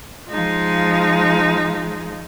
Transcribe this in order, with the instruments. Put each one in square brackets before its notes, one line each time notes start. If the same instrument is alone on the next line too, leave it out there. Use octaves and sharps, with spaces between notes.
[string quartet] F3 G#3 D#4 F4